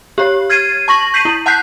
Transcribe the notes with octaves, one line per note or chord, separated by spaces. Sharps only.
G4 C#5
F6 G#6 A6 C7 D#7
A5 C#6 A#6 F#7
G6 B6 C7 D#7 F#7
E4
F#5 A5 F#6 G6 B6 C7